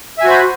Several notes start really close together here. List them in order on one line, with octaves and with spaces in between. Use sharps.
E5 G#5 F#4 C5 B5